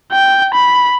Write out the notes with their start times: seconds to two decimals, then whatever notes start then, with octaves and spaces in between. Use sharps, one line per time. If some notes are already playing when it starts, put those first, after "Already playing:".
0.12 G5
0.55 B5